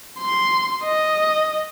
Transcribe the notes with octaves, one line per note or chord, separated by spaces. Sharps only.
C6
D#5